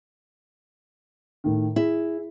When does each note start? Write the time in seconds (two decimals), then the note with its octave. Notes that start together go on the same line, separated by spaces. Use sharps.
1.44 A2 D#3
1.76 E4 G#4